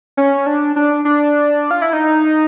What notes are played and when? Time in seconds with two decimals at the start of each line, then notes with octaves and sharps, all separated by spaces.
0.17 C#4
0.46 D4
0.76 D4
1.05 D4
1.71 F4
1.82 E4
1.93 D#4